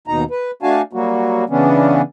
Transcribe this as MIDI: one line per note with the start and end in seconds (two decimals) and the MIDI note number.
0.08 0.24 39
0.08 0.24 47
0.08 0.24 63
0.08 0.24 82
0.31 0.51 71
0.63 0.82 57
0.63 0.82 62
0.63 0.82 66
0.63 0.82 77
0.63 0.82 80
0.63 0.82 81
0.93 1.44 54
0.93 1.44 55
0.93 1.44 58
0.93 1.44 66
1.50 2.02 49
1.50 2.02 52
1.50 2.02 59
1.50 2.02 61
1.50 2.02 62